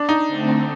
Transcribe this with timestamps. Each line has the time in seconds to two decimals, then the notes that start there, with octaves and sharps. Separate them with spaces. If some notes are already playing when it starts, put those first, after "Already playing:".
Already playing: D4
0.09 D#4
0.28 D3 A3 C4